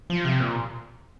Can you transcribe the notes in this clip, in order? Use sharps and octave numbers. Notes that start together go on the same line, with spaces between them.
F3
C3
A#2